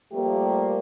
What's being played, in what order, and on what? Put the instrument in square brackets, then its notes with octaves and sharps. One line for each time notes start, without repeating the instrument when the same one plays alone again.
[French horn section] F3 G3 A3 A#3 G4